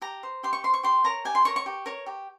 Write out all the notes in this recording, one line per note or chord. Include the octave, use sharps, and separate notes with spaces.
G4 A#5
C5
G4 C6
C#6
C5 C6
C#6
G4 C6
A#4 C#5 A#5
G4 G#5
C6
A#4 C#5 C#6
C#6
G4
A#4 C#5
G4